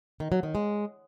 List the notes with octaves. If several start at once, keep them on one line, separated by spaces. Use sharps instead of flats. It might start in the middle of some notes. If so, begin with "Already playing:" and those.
D#3
F#3
D#3
G#3